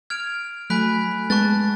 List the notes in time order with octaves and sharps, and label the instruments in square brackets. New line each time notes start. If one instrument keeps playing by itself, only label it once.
[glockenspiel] F6 G#6 D7 F7
[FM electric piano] F#3 A3 [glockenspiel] G#5 B5 F#6 B6 D7
[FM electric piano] G#3 B3 [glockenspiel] A5 C#6 F#6 A6